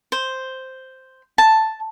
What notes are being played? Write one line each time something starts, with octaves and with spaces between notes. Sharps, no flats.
C5
A5